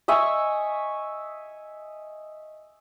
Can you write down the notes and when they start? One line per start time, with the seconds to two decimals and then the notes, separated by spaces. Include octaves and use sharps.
0.08 D#5 E5 G#5 C#6